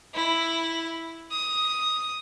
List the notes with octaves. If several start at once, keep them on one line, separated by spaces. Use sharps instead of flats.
E4
D#6